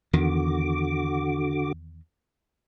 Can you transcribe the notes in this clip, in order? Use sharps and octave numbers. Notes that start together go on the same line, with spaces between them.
E2 D3 D#3 F#4 D6